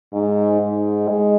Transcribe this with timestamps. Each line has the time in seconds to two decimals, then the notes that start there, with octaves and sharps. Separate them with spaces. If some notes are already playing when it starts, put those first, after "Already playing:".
0.13 G#2
0.61 G#2
1.09 G#3